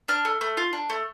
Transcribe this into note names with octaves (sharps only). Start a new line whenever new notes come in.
D4 F6
A3
A3
F4
D4
A3